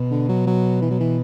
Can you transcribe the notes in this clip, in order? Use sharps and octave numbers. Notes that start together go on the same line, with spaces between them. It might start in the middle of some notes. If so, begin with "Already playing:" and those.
Already playing: B2
D3
F#3
F#3
E3
F#3
E3